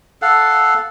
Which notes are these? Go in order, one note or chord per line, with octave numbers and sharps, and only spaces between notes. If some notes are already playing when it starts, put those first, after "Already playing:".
A4 F5 F#5